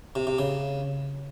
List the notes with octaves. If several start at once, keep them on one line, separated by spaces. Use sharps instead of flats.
C3
C3
C#3